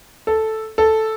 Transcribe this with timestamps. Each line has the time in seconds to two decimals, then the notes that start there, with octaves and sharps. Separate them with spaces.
0.27 A4
0.78 A4